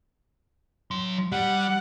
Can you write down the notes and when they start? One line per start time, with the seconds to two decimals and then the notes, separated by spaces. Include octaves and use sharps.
0.91 F#3 C6
1.32 G3 F#5